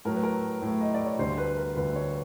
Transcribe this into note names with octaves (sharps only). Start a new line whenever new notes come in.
A2 F#3 A3 A#4
B4
A#4
A2 F#3 A3
D#5
D5
C#5
D2 D3 G3 C5
B4
A#4
D2 D3 G3 B4
C#5